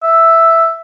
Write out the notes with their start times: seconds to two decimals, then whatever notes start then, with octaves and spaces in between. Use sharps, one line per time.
0.03 E5